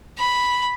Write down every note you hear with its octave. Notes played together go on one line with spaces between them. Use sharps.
B5